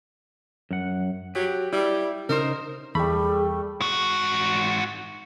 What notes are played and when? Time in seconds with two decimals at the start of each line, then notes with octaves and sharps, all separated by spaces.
0.71 F#2 F#5
1.35 F#3 G4
1.73 G3 E4
2.29 C#3 D#4 A#4 C5
2.95 E2 G3 A3 G#4 B5
3.81 G#2 F#4